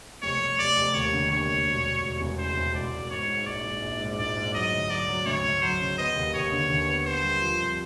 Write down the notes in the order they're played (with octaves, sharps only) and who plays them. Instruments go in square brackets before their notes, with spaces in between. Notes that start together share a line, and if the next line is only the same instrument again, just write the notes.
[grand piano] F1 [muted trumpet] C#5
[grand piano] F1
[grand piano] F1 [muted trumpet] D5
[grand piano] F1
[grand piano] D#2 [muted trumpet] C#5
[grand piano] D3
[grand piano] D#2 [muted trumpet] C#5
[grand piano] F1
E1
E1
E1
E2
[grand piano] C#3 [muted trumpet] C5
[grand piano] E2
[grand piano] E1 [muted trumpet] D5
[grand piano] E1
[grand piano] G#2 [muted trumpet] C#5
[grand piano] G#2
[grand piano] A#1 [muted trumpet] D5
[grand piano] G#2
A#1
G#2
[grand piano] A#1 [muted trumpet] D5
[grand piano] G#2
[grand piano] F#3 [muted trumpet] D#5
[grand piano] D2
[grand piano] F#3 [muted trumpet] D5
[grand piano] F#3
[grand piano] D2 [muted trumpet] C#5
[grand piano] D2
[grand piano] F#3 [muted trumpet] C5
[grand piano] C#3
[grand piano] B3 [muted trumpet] D#5
[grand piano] D#2
[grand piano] D#2 [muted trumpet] C#5
[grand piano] D3
D#2
B3
[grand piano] B3 [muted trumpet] C5
[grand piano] G3
F3
F2